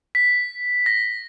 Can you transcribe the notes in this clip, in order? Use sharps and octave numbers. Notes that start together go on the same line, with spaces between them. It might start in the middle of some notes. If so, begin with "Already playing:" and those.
B6
A#6